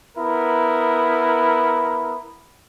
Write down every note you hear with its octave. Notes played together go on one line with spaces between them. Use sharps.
B3 E4 A#4